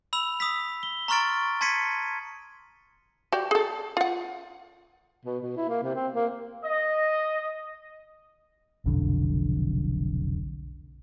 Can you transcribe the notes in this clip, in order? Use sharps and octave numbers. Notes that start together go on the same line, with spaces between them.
B5 E6 F7
D#6 E6 B6
G7
A#5 C6 C#6 F6 A6 D7
A5 C6 G#6 B6 C#7 D#7
F#4 G4 D5
G#4 A4
F4 F#5
B2
B2
E4
A#3
C3
C4
A#3
D#5
F1 B1 F2 D3